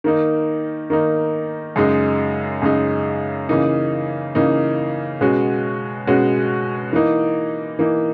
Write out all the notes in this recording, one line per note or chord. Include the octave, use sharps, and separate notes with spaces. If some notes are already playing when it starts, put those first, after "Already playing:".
D#3 A#3 D#4
D#3 A#3 D#4
F#2 C#3 G#3 D#4
F#2 C#3 G#3 D#4
C#3 E3 A#3 D#4
C#3 E3 A#3 D#4
B2 G#3 C#4 F#4
B2 G#3 C#4 F#4
E3 A#3 D#4
E3 A#3 D#4